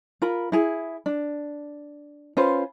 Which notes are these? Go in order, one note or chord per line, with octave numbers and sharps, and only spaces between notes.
F4 A#4 B5
E4 G#4
D4
C#4 F4 B4 C5